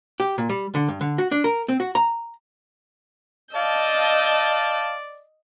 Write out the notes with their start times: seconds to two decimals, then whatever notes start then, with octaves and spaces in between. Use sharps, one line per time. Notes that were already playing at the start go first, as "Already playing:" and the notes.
0.20 G4
0.38 A#2
0.49 G3
0.75 D3
0.88 G2
1.01 D3
1.18 F#4
1.31 D4
1.44 A#4
1.69 C4
1.80 F#4
1.95 A#5
3.55 D5 D#5 F5 A5 E6 G6